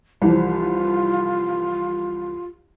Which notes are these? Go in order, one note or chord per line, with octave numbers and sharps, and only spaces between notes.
C2 E3 F3 F4